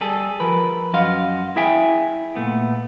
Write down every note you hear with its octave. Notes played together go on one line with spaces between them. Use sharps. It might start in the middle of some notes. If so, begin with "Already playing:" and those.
G3 G#4 A4
F3 A#4 B4
F#2 F#4 D#5 F5 C6
E4 G#4 E5 G5 G#5
A#2 A3 B3